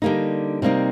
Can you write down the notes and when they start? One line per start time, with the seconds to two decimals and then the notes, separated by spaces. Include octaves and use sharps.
0.02 D3 G3 A#3 D#4
0.62 C3 G3 A#3 D#4